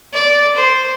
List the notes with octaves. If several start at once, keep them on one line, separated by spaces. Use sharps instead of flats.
D5
C5